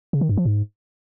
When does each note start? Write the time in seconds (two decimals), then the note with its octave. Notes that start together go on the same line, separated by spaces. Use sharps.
0.13 C#3
0.21 D#3
0.29 G2
0.37 F3
0.46 G#2